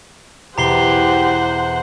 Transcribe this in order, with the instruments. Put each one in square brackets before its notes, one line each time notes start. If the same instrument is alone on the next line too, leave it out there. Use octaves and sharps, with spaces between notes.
[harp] E2 B2 [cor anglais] G4 [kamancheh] C5 F#5 [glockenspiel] A#5 C7 G7